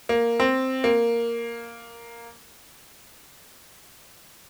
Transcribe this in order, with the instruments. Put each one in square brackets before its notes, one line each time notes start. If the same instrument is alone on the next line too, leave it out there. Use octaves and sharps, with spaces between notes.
[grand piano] A#3
C4
A#3